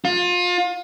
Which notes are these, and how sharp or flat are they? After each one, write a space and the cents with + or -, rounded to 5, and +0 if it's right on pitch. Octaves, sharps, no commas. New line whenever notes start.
F4 +30